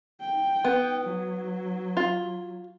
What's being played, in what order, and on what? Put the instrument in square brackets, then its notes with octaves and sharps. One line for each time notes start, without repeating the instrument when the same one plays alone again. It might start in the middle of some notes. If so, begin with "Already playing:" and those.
[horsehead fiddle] G5
[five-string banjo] B3
[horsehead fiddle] F#3
[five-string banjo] F4